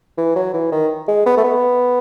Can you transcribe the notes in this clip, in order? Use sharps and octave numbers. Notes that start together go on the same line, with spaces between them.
E3
F#3
E3
D#3
G#3
B3
A3
B3